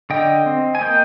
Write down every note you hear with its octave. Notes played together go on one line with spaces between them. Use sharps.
D3 D#5 G5
C4
G#5
A#3 D#5 G5